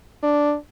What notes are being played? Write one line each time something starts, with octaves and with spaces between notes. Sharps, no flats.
D4